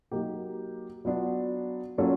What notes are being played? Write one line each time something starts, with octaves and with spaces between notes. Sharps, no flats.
F#3 A#3 D#4 G4
F#3 B3 D4 F4
F#3 A#3 C#4 F4 A4